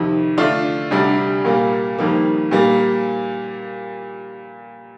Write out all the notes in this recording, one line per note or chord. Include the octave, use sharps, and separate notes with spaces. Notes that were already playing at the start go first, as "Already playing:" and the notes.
Already playing: F2 C3 D#3
D3 A3 D4 F4
D2 C3 G3 D4
A#2 G3 A#3
F2 D#3 G3 A#3
A#2 G3 A#3